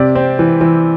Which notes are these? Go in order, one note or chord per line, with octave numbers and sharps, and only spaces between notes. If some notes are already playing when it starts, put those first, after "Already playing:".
Already playing: C3 D5
C4
E3
E3